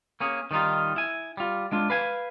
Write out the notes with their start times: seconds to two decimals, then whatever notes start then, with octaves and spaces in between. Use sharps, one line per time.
0.20 A#3 C#4 G#4
0.51 D#3 G3 D#4 F4
0.96 E4 G#5
1.37 G3 F4
1.72 G#3 D4 F4
1.90 B4 F5 G#5